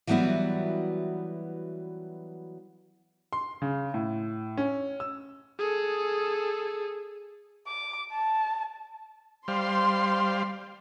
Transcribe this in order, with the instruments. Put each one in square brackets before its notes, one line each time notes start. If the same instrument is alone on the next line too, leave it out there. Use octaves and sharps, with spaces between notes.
[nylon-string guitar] E3 F#3 G3 B3 E4 F#4
[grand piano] C6
C#3
A2
C#4
E6
[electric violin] G#4 A4
[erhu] D6
A5
[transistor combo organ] G3 C5 F5 [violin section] C6